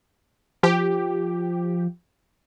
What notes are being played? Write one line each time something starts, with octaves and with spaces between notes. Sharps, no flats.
F3 G4